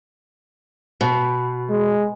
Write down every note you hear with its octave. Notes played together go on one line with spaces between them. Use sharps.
B2
G#3